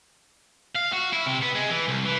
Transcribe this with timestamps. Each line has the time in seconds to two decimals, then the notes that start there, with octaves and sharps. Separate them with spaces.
0.75 F5
0.92 F#4
1.13 E4
1.26 C3
1.42 B3
1.55 G#3
1.70 E3
1.88 C2
2.05 E3